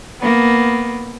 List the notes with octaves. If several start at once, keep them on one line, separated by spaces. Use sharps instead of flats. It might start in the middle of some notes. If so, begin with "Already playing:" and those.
A#3 B3